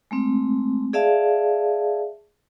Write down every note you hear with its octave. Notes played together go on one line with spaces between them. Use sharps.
G#3 A3 C4
G#4 D5 E5 F5 A5